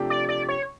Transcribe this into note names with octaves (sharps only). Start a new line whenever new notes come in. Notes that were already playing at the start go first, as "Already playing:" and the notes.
Already playing: C3 F3 A3 D4 G4
D5
D5
C#5